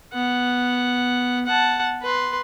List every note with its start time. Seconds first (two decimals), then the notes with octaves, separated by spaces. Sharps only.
0.13 B3 F#5
1.45 F#5 A5
2.02 B4 C6